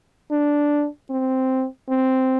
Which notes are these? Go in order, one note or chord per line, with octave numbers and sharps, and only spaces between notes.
D4
C4
C4